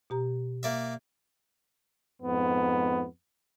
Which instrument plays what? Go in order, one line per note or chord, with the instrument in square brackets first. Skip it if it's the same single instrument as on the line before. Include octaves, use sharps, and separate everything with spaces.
[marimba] B2 G4 A#5
[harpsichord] A#3 D5 E5
[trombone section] F2 G#2 B3